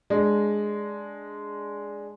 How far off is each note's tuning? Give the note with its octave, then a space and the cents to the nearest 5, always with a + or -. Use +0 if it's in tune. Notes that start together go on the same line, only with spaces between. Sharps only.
G#3 +0 D4 -5